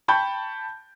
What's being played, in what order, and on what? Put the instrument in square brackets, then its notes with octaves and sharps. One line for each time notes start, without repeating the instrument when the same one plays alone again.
[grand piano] G5 A5 B5 C#6 G6